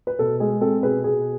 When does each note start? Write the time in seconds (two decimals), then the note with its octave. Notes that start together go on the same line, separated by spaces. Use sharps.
0.07 B4
0.19 B2 A4
0.40 G#3 G#4
0.61 C4 A4
0.83 B2 G#4 B4
1.04 B2 G#4